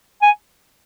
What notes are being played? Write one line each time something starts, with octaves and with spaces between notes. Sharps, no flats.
G#5